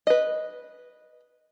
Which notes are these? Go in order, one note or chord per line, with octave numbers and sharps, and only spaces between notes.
B4 D#5